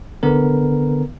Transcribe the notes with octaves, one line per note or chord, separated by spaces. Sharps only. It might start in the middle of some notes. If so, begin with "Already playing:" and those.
D3 B3 A#4